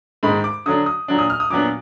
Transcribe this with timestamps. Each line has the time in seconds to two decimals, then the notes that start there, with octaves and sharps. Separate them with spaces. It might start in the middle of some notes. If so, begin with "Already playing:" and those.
0.23 G#2 D#3 G#3 B5
0.44 D6
0.66 D3 F#3 D4 D#6
0.86 D#6
1.08 A#2 F#3 D4
1.19 D#6
1.30 F6
1.40 D#6
1.50 A#2 F#3 B3 D4 D6